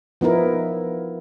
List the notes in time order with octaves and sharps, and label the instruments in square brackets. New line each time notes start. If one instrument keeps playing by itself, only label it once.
[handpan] F3 B3 D#4 E4 A#4